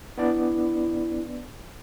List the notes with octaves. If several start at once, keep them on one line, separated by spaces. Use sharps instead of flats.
B3 D4 E4 D5